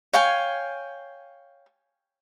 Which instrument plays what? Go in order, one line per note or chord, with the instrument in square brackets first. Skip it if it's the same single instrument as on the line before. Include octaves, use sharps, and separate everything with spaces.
[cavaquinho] C#5 F5 G5 G#5